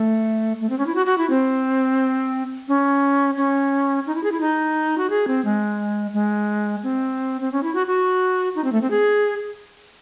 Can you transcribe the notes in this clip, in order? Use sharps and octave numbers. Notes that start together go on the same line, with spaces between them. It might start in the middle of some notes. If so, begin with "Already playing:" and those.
Already playing: A3
A3
C4
C#4
E4
F#4
F#4
E4
C4
C#4
C#4
D#4
E4
G#4
E4
D#4
F#4
G#4
C4
G#3
G#3
C4
C4
C#4
E4
F#4
F#4
D#4
C4
A3
C4
G#4